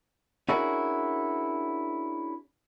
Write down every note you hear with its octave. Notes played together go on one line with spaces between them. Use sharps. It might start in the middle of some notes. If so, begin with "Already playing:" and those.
C#4 D4 E4 F#4 G#4 A#4